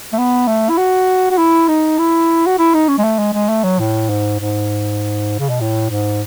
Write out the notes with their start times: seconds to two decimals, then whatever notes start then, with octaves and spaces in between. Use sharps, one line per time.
0.13 A3
0.18 B3
0.47 A3
0.69 E4
0.78 F#4
1.31 F#4
1.38 E4
1.68 D#4
1.98 E4
2.46 F#4
2.59 E4
2.74 D#4
2.88 C#4
2.98 G#3
3.04 A3
3.19 G#3
3.34 G#3
3.49 A3
3.64 F#3
3.79 A2
4.10 G#2
4.40 G#2
5.39 C#3
5.50 B2
5.61 A2
5.90 G#2